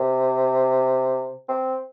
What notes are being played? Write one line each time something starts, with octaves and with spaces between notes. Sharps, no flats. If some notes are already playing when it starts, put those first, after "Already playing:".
Already playing: C3
C4